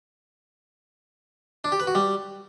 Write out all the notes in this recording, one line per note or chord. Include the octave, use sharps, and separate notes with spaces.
D4
G4
B4
F#4
G3